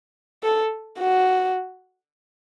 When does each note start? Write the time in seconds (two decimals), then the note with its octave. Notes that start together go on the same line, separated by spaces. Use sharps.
0.43 A4
0.99 F#4